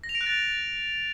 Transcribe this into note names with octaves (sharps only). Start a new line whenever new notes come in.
A#6
F7
D7
F#6
A6